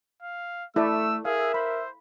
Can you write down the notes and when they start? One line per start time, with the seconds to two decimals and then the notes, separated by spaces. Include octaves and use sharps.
0.22 F5
0.76 A3 E4 A4 D5 E6
1.25 G#4 A#4 E5 F5
1.54 C5 B5